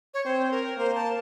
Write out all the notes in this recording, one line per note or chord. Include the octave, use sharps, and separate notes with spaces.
C#5
C4 C5
A#4
A#3 C5
A5